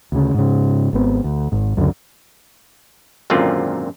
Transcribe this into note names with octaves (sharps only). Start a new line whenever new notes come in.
D2 C#3
G#2 C#3
G#1 B3 C4
D2
G#1 G#2
C#2 F#2 D3
G#1 F#2 A#2 D3 C4 F4